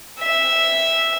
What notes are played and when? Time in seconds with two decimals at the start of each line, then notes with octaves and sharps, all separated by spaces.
0.20 E5